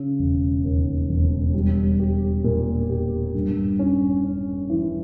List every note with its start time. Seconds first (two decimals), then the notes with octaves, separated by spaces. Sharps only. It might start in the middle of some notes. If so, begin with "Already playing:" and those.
Already playing: C#3
0.19 E1
0.64 D#2
1.09 E1
1.54 G3
2.00 G4
2.44 A#2
2.89 G4
3.34 G2
3.79 C#4
4.24 C#4
4.70 E3